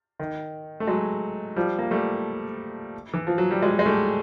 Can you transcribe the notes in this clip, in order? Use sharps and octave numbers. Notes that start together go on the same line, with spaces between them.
D#3
A3
F#3 G#3
F3 G3
A#3
G3 A3
E3
F3
F#3
G3
F#3 G#3
G#3
G3 A3